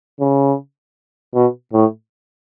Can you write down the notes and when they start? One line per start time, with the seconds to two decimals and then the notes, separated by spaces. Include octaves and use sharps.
0.20 C#3
1.35 B2
1.73 A2